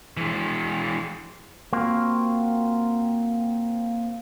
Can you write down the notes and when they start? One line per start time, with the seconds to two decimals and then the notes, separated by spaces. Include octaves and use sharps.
0.17 E3 G#3
1.73 A#3 C4 F4 F#4